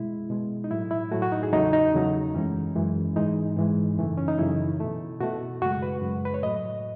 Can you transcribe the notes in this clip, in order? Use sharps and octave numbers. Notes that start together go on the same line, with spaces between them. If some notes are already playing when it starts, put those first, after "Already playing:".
Already playing: B2 G#3 E4
B2 G#3
D#4
A2 F#3 A3 E4
E4
A2 F#3 A3 F#4
F#4
D#4
G#4
E2 C#3 F#3 A3 D#4
D#4
E2 C#3 F#3 A3
F#2 E3 G#3 C#4
F#2 E3 G#3
G#2 E3 G#3 D#4
G#2 E3 G#3
F#2 C#3 E3 A3
C#4
D#4
F#2 C#3 E3 A3 E4
B2 A3
B2 A3 F#4
F#2 C#3 G#3 F#4
B4
F#2 C#3 G#3
B4
C#5
A2 F#3 A3 D#5